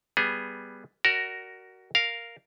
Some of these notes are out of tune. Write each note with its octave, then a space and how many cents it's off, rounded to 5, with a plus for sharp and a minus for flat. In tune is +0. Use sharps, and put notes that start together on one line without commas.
G3 +0 B3 +0 G#4 +0
F#4 +20 A#4 +0 D5 +0
A#4 +0 F5 +0